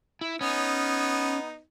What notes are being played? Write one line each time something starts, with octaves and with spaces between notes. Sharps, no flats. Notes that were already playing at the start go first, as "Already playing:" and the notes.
E4
B3 C#4 D#4